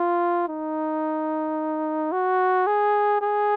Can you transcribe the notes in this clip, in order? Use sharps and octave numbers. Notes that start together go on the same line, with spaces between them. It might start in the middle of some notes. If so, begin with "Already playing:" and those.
Already playing: F4
D#4
F#4
G#4
G#4